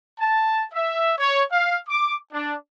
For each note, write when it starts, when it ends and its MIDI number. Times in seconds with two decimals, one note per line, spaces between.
0.20 0.64 81
0.74 1.13 76
1.18 1.44 73
1.52 1.77 77
1.89 2.15 86
2.33 2.55 62